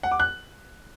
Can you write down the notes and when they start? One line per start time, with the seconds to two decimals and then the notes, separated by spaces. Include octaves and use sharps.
0.03 F#5
0.11 D6
0.20 F#6